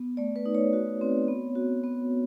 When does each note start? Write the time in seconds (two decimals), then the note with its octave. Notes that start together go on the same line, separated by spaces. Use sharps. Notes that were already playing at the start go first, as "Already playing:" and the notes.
Already playing: B3
0.17 A3 D5
0.36 B4
0.46 D#4
0.55 C#5
0.73 F#4
1.01 C4
1.28 B3
1.55 F#4
1.84 B3